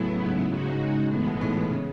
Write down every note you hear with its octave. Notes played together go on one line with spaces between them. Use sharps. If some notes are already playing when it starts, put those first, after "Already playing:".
Already playing: A2 C#3 F#3 B3 E4
G#2
G#2
G#2 C#3 G#3 D#4 F#4
G#2
A2 E3 G#3 B3
B2
G#2
A2
B2
C#3